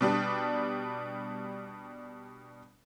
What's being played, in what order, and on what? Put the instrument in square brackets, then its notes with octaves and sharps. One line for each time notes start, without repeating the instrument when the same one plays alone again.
[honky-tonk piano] B2 G3 D4